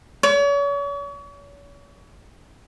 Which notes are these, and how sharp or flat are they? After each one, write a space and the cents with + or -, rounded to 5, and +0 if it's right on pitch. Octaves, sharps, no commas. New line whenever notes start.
C#5 +40